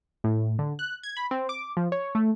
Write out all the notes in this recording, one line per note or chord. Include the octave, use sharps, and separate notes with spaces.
A2
D3
F#6
G#6
B5
C4
D6
F3
C#5
A3